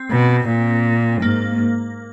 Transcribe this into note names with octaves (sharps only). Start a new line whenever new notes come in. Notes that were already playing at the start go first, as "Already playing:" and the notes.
Already playing: C4
B2
A#2
G#2 A#3